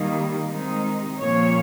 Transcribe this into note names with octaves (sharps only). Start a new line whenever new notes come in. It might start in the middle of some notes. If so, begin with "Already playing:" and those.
Already playing: D#3 G3 A#3 D#4
C3 D#3 G#3 D#4
A#2 F3 A#3 C#4 C#5